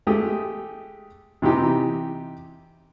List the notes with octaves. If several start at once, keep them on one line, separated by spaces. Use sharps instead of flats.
G#3 A3 G4 D#6
C3 E3 D#4 G4